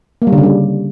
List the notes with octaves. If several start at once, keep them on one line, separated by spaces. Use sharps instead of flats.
A#3
G3
D3
C#3
G3